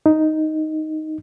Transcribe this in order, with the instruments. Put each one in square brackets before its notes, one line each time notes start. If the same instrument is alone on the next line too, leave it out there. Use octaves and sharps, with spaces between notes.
[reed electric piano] D#4